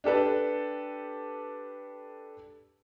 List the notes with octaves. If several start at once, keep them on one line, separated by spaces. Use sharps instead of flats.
D4 G4 A4 B4